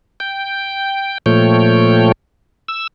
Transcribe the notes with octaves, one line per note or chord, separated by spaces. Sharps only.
G5
A#2 F3 A3 C#5 G5
E6